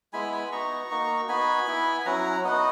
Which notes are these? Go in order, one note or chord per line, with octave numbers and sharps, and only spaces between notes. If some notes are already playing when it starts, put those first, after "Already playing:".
G#3 B3 E4 G#5 B5
G#5 B5
B3 D#4 F#4 A#5 C#6
A#3 D#4 F#4
B3 D#4 F#4 G#5 B5
B3 E4
G#5
F#3 C#4 E4 F#5 A#5
B3 D#4 F#4 D#5 F#5